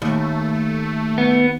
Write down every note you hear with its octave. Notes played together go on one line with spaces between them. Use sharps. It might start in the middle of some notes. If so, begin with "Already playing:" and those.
D#2 A3
B3